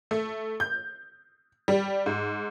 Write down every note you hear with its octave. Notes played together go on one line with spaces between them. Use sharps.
A3
G6
G3
G#2